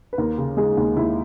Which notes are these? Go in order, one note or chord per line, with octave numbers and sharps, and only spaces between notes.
B4
D#2 A#4
C#3
G#3 G#4
D#2
D#2 E4